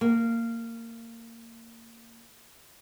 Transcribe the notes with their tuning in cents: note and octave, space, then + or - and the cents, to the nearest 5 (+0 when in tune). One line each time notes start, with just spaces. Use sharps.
A#3 -20